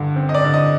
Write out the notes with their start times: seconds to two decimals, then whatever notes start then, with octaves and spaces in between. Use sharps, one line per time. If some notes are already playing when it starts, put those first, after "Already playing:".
Already playing: G2 D3
0.16 C4
0.29 D#5
0.34 D5
0.44 D3
0.54 D#5